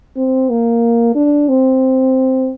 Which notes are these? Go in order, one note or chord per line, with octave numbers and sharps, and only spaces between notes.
C4
A#3
D4
C4